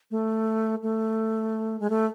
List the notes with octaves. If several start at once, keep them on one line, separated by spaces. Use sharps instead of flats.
A3
A3
G#3
A3